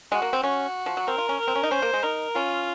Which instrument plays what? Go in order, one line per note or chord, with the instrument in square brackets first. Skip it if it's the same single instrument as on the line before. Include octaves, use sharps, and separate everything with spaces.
[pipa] G#3 [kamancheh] F#4
[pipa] A#3
C4
[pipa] C#4 [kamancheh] F#4
[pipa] F3
F#3
[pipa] C4 [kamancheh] A#4
[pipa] F4
C#4
[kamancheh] A#4
[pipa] C4
C#4
D#4
[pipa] C#4 [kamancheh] C5
[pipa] A#3
G#3
[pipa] D#4 [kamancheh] A#4
[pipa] C#4 [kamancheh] F4